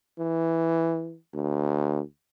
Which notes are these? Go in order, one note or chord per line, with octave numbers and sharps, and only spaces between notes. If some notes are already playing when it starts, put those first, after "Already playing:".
E3
D2